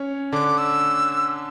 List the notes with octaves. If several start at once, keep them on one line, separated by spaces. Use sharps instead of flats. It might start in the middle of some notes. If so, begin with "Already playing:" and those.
Already playing: C#4 C#5
D3 D4 D6
E6